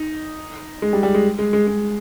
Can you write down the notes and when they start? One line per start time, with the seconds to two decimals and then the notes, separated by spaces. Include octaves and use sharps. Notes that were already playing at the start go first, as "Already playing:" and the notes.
Already playing: D#4
0.82 G#3
0.93 G3
1.03 G3
1.14 G#3
1.39 G#3
1.53 G#3
1.67 G#3